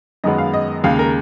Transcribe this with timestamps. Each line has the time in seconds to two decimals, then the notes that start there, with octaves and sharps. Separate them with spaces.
0.24 F#2 D#3 G#3 B3 D#5
0.38 F5
0.53 D#5
0.83 D#2 C#3 G#3 F5
0.99 A#4